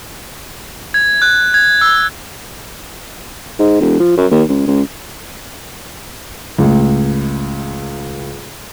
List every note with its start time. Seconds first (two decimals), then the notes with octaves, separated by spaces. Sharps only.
0.94 G#6
1.22 F#6
1.54 G#6
1.81 E6
3.59 G#2
3.81 E1
4.00 F3
4.17 F#2
4.31 D#2
4.49 C#2
4.68 C#2
6.58 C#2 A2